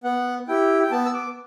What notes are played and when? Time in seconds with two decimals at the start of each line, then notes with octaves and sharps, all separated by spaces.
0.04 B3 F#5
0.48 E4 G4 G5
0.82 G5
0.91 B3 A5
1.06 E6
1.14 D6